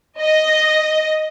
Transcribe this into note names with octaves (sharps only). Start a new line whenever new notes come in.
D#5